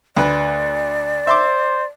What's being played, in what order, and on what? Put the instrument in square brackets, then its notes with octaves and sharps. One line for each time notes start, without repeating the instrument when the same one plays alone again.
[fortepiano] D2 B4 [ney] D5
[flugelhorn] C5 [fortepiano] E5 C6 D6